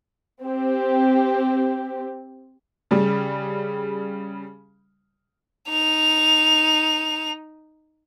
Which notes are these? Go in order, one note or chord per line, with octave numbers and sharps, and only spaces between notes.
C4 G4
C#3 G3
D#4 F7